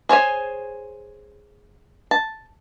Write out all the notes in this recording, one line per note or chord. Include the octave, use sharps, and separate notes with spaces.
G#4 C5 C#5 G#5
A5